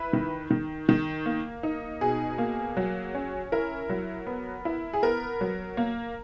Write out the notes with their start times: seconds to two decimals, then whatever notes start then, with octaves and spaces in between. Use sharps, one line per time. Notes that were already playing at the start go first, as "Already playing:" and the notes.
Already playing: E4 B4
0.13 D#3
0.51 D#3
0.89 D#3
1.26 A#3
1.63 D#4
2.01 B2 G#4
2.38 A#3
2.77 F#3
3.15 C#4
3.52 E4 A#4
3.90 F#3
4.27 B3
4.65 E4
4.93 G#4
5.03 B3 A#4
5.41 F#3
5.77 A#3